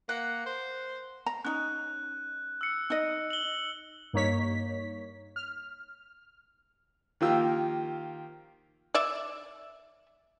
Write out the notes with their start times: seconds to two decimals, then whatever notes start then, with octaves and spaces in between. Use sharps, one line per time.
0.09 A#3 F#5
0.46 C5
1.26 A#5
1.45 C#4 D#4 F#6
2.61 E6 C#7
2.90 D#4 D#5
3.30 F#7 G7
4.13 G2 A#3 D#4 C#5 B6
5.36 F6
7.21 D#3 F3 A#3 F4 G4 E6
8.94 D5 E5